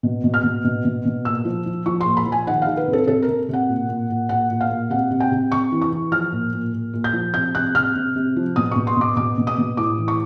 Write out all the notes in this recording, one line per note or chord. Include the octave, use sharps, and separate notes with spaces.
B2
B2
F6
B2
B2
B2
B2
A#2 E6
F3
F3
F3 C#6
C6
A#2
B5
F3
G#5
D#3 F#5
F5
D#3
B4
C3
A4
C3 A4
A#4
C3
C3 F#5
A#2
A#2
A#2
A#2 F#5
A#2
F5
A#2
C3 F#5
C3
G5
C3
C3 C#6
E3
C#6
E3
F3 F6
A#2
A#2
A#2
A#2
G6
F3
C3 G6
C3 F#6
C3 F6
C3
C3
F3
B2 D#6
B2 C#6
C6
B2 D6
B2 D6
B2
D#6
B2
A2 D6
E3
C#6